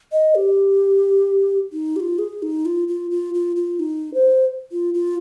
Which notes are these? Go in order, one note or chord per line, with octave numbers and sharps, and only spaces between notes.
D#5
G4
D#4
G4
F4
G#4
D#4
F4
F4
F4
F4
F4
D#4
C5
F4
F4